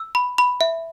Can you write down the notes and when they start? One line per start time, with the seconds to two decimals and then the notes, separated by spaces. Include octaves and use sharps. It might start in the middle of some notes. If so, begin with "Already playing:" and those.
Already playing: E6
0.15 B5
0.38 B5
0.61 E5